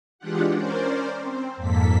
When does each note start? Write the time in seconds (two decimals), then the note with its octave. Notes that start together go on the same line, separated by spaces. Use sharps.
0.18 E3 G#3 D4 F4 G4 F#5
0.52 C#4 A#4 C5 D5
1.19 C4
1.57 F2 G#2 A#3 A4 B6